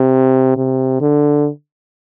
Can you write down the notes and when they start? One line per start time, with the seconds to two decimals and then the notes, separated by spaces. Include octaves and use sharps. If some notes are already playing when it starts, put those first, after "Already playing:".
Already playing: C3
0.57 C3
1.01 D3